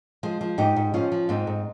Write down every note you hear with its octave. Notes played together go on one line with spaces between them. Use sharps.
F3 G#3
F3
G#2 D#4 G4
G#2
F3 C#4 F4
F3
G#2 C4 D#4
G#2